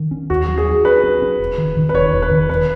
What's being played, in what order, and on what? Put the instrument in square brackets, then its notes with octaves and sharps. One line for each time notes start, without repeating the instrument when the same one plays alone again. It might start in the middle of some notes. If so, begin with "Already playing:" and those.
Already playing: [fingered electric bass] D#3
C#4
[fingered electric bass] D#2 [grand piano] F#4
[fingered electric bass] F#3
[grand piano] G#4
[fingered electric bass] F#3
[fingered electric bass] C#4 [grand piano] B4
[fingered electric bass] C#4
C#4
E1
D#3
D#3
[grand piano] B4
[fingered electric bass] E1 [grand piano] C#5
[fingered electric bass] E1
[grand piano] B4
[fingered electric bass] D#3
[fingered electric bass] E1 [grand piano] B4